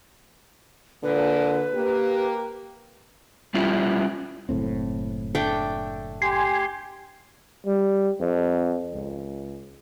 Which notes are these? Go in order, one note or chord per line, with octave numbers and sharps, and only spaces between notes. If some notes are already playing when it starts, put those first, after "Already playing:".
A#2 D3 B4
A#3 G4
G3 C#4 E4 F4 G4
F#1 A2 C4
A3 D4 G5
G4 G#5 C6
G3
F2
C#2